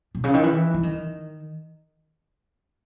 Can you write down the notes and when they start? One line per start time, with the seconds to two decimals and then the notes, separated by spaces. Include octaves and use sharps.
0.15 B2
0.24 C#3
0.34 D#3
0.43 E3
0.74 E3
0.83 D#3